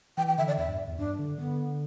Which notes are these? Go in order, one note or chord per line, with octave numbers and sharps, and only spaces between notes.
E3 G5
G5
D3 E5
D5
E2 E5
G2
E2
G2 D4
D3
D3 B3